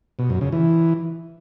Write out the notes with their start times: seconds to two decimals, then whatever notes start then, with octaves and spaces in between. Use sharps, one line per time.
0.19 B2
0.30 F#2
0.41 C#3
0.52 E3